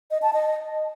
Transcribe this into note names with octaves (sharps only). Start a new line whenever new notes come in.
D#5
A5
D#5